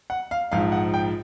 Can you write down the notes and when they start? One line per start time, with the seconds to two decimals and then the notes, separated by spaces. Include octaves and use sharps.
0.10 F#5
0.31 F5
0.52 A#1 G#2 F3 F5
0.72 F#5
0.94 G5